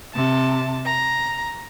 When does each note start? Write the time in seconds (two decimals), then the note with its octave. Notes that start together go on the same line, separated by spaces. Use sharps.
0.14 C3 A5
0.85 A#5